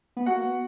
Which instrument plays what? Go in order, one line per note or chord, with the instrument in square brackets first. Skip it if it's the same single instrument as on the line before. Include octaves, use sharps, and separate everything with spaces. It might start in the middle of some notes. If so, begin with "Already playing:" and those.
[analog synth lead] B3
[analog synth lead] A#3 [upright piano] F#4 F#5
[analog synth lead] B3